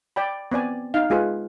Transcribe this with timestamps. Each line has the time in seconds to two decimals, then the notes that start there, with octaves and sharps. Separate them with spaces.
0.16 D5 G5 B5
0.52 B3 C4 D5 G#5
0.94 D#4 F5
1.10 G#3 F4 G#4 B4